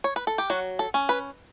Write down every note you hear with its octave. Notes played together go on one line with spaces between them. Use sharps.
C#5
B4
A4
G4
F#3 F#4
A4
C#4
B4